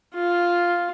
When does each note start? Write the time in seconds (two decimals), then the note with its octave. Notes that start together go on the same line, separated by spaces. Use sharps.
0.15 F4